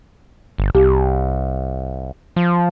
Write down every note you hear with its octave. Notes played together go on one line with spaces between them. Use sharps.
G1
C2 G4
F3